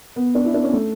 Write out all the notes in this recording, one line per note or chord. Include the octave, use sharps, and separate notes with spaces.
B3
D4
E4
D4
C#4
A3